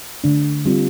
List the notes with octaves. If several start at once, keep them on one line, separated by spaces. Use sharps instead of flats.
D3 A3 D4
G3 C4 F4